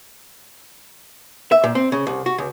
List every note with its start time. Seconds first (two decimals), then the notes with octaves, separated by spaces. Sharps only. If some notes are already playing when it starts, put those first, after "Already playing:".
1.51 E5
1.64 A#2
1.75 C4
1.92 C#3
2.07 C2
2.26 F#4
2.38 C#2